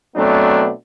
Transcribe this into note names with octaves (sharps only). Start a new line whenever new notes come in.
B2 F#3 A3 B3 C4 D4